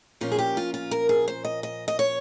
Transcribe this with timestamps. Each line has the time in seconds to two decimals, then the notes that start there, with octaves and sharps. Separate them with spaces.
0.21 A#2 F3 A#3 C#4 F4
0.32 G#4
0.39 G4
0.57 F4
0.74 F4
0.91 A#4
1.09 G#4
1.28 C5
1.45 D#5
1.63 D#5
1.88 D#5
1.99 C#5